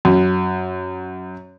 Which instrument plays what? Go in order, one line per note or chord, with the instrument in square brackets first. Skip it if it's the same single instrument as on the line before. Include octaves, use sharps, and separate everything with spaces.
[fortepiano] F#2